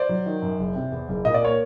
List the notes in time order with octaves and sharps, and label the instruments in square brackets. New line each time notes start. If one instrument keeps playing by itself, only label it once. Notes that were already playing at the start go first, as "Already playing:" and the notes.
Already playing: [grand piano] C5 D5
F#3
D#3
F#2
F#1
C3
E2
F#1
A#2 D#5
D5
A#3 C#5